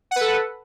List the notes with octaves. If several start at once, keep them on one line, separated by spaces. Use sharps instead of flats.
A4 B4 F#5